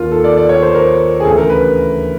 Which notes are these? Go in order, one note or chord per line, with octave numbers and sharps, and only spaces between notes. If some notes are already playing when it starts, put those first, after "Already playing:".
Already playing: D#2 D#3 F4
A4
D5
D5
C#5
C5
A#4
G#4
D2 C#3 E3 A4
A#4
B4